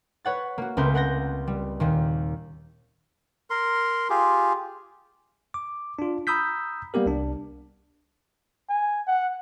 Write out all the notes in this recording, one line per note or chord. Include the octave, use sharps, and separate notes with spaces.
B4 C#5 F#5 A6
A#3 F#4
C#2 A3 C4 A#4 B4 G6
A#4 F#5 G6 A#6
G3
D#2 A#2 D#3
A#4 C6
F4 G4 G#4
D6
D4 F4
A#5 B5 D#6 E6 G6 B6
G3 A#3 B3 G4 A#4
C2 D4
G#5
F#5